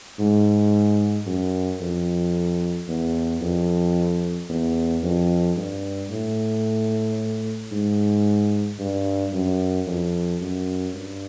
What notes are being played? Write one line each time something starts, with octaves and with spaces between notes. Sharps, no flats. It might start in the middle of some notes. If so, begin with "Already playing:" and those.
G#2
F#2
F2
E2
F2
E2
F2
G2
A2
G#2
G2
F#2
F2
F#2
G2